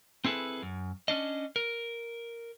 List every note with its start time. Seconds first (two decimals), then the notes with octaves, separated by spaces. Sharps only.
0.25 C4 E4 G#4 A4 B4
0.63 F#2
1.08 C#4 D4 D#5
1.56 A#4